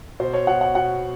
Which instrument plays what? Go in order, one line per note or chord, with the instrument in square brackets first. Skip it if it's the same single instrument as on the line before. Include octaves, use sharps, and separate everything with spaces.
[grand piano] B2 C5
C#5
B2 F#5
F#5
B2 F#5